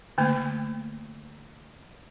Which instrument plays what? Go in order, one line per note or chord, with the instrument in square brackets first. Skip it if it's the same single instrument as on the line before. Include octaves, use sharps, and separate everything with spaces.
[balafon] D3 A3 A#3